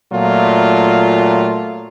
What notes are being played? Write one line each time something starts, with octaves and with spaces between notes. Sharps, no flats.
A#2 F#3 A3 F4